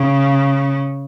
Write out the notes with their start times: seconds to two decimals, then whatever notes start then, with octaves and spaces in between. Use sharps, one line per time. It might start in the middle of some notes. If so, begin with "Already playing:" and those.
Already playing: C#3